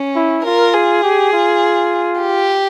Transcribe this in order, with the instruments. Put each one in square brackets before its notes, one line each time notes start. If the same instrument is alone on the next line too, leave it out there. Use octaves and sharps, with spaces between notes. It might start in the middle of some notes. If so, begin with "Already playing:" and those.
Already playing: [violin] C#4
[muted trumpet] E4
[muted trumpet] F4 [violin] A#4
[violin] G#4
[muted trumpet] G4
F4
[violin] G4